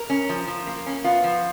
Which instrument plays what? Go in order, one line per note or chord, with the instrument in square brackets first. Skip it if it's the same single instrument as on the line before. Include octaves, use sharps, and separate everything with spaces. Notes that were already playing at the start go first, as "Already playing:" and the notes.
Already playing: [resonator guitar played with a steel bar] A#4
C#4
F3
F3
A#3
C#4
B3 F4
F3